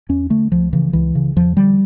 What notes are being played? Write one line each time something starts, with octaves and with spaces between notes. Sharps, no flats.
E2 C#4
D3 A3
C#2 F3
C#3 E3
C#2 E3
C#3
E2 F3
D3 G3